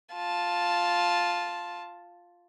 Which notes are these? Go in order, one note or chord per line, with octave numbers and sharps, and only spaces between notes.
F4 A5